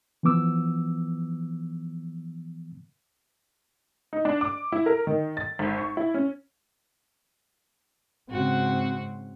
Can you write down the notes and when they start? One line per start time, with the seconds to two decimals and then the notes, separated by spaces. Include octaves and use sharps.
0.23 E3 F3 B3 D6 E6
4.13 D#4
4.25 D4
4.41 D6
4.72 E4
4.86 A#4
5.07 D#3
5.37 A6
5.59 G#1
5.78 C#6
5.97 E4
6.14 C#4
8.30 G#2 C#3 C4 F#4